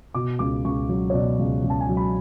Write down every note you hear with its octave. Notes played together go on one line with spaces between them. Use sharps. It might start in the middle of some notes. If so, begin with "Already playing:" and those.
B2 D6
C#2 D6
C#2 C#6
F#3
C#5
B2 D5
C#2
C#2
A5
G#5
F#3
B5